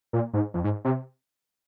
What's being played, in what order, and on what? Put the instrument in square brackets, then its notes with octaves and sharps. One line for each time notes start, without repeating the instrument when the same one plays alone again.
[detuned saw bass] A#2
G#2
F2
G#2
C3